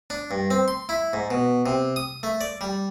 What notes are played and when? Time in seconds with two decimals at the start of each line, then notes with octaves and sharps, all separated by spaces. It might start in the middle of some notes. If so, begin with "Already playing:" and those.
0.10 D4
0.31 G2
0.51 C4
0.68 C6
0.89 E4
1.13 G#2
1.31 B2
1.66 C3
1.96 D#6
2.23 A3
2.41 D5
2.61 G3